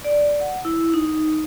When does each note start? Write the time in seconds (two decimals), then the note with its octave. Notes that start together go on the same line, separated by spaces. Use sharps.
0.04 D5
0.40 F#5
0.65 E4
0.94 D#4